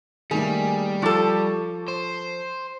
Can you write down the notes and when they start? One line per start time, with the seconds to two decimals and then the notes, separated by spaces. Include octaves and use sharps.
0.31 D#3 G3 A3 A#3 G#4
1.02 F3 A4 C#6 D6 A6
1.88 C5